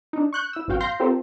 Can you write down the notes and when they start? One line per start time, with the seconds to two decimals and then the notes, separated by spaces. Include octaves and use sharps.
0.13 D4 D#4
0.33 C#6 F#6 G6
0.53 E4 E6
0.68 G#1 F#2 B2 F#4 F5 G5
0.81 F5 C6 G6 A#6 C7
1.00 C4 F4 G4 A4 A#4 C5